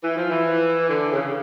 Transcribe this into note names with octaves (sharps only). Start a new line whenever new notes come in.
E3
F3
E3
D3
C#3